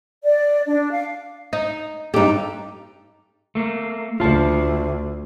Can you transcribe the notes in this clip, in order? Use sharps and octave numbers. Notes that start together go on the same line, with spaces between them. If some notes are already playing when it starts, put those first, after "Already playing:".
D5
D4
F5
D#4
G2 D#4 G4 A4
A3 A#3
D2 F4 A5